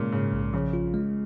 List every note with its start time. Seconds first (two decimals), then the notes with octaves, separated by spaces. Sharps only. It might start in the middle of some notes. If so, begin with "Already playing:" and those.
Already playing: A#2 C#3 G#3
0.12 G#2 C#3
0.33 A#1
0.53 C#3 F3
0.73 F4
0.94 G#3